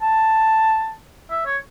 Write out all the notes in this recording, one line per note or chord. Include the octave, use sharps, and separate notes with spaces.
A5
E5
C#5